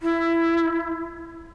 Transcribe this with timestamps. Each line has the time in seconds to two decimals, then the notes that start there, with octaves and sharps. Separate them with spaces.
0.02 E4